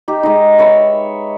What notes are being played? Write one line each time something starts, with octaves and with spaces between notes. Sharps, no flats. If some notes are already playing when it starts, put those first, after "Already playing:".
D#4 G4
G#3 D#4
B4 C#5 E5